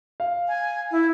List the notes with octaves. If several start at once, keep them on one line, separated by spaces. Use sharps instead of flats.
F5
G#5
E4